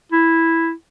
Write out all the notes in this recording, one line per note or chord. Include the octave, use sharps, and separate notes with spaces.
E4